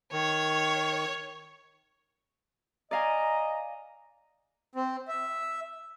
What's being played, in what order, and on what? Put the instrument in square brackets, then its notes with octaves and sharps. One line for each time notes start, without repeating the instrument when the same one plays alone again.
[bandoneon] D#3 [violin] C#5
[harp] D5 F5 G#5 [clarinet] D#5 [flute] A#5
[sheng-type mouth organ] C4
E5